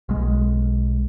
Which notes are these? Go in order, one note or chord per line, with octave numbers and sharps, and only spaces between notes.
B1 G#3